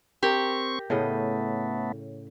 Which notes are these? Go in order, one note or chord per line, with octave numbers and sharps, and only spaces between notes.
C4 G4 A#4 C#6
A2 C#3 A3 B3 D#5